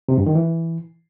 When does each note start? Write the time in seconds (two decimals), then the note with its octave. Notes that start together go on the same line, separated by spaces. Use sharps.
0.08 C3
0.17 G2
0.26 D#3
0.35 E3